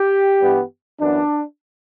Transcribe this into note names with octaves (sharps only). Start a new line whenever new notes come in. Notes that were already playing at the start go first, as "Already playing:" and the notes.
Already playing: G4
G2 E3 G3 B3
F#2 E3 B3 D4